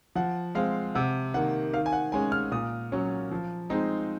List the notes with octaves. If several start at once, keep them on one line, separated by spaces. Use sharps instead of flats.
F3 F#5
G#3 C4 F5
C3 F#5
D#3 A#3 F#5
D#3 F5
G#5
F#5
G#3 C#4 G#5
F6
A#2 D#6
F#3 C#4
F3
G#3 C4 D#4